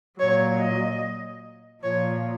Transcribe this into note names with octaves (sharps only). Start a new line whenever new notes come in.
A#2 F#3 C#5
D#5
A#2 F3 C#5